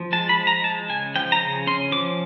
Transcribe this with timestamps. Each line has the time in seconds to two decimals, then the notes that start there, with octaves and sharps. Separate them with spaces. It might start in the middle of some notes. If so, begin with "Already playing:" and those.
Already playing: F3
0.12 G#3 A5
0.29 B5
0.38 F3
0.47 A#5
0.64 G#3 A5
0.89 C#3 G#5
1.15 F3 G5
1.32 A#5
1.41 C#3
1.67 C#4 C6
1.92 F3 D6